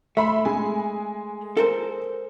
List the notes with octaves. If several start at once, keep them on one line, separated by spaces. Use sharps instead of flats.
A3 E5 B5 C6
G#3 G#5
A4 A#4 C5